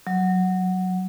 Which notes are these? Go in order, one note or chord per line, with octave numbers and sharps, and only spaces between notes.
F#3